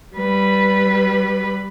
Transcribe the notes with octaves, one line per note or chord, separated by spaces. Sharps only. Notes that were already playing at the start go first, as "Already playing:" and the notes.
G3 B4